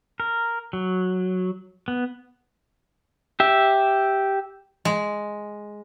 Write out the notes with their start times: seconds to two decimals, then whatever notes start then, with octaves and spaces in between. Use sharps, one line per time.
0.20 A#4
0.73 F#3
1.88 B3
3.40 G4 E5
4.85 G#3